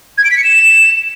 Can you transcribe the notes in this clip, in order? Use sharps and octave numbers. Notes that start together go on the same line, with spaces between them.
G#6
D7
B6
C#7
E7